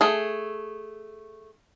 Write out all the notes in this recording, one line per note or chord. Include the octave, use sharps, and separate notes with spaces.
A3 G#4